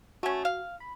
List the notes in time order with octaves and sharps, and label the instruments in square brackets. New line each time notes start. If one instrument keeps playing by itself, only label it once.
[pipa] A3 C#4 [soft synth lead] F#4
[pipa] F5
[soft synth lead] B5